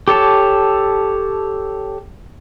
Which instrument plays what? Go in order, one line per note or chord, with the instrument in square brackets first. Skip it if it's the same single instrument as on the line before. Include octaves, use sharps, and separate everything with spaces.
[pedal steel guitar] G4 A4 C#5 A5